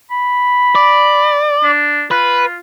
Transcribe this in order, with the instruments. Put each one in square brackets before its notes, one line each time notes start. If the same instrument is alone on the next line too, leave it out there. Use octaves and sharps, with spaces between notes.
[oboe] B5
[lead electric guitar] D5
[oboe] D4
[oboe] F4 [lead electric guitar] B4